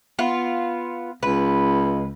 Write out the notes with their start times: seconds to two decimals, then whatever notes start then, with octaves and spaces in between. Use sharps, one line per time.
0.19 B3 F4
1.23 C#2 B4